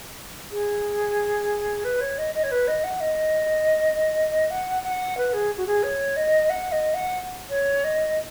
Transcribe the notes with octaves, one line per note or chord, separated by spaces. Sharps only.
G#4
B4
C#5
D#5
D#5
C#5
B4
D#5
F#5
D#5
F#5
F#5
B4
G#4
F#4
G#4
C#5
D#5
F#5
D#5
F#5
C#5
D#5